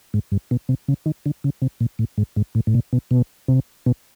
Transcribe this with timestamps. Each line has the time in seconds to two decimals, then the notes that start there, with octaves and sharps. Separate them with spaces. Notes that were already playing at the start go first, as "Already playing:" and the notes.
0.14 G#2
0.32 G2
0.51 B2
0.69 C3
0.88 C#3
1.06 D#3
1.26 D3
1.44 C#3
1.62 C3
1.80 A#2
1.99 A2
2.18 G#2
2.36 G#2
2.55 A2
2.67 A2
2.74 A#2
2.93 B2
3.11 B2
3.48 C3
3.86 B2